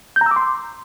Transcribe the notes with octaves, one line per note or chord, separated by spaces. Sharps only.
G6
A#5
E6
D6
C6